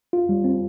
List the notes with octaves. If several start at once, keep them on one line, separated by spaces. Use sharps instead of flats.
F4
G3
C4